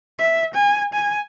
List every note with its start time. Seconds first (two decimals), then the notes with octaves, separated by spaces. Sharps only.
0.19 E5
0.54 G#5
0.93 G#5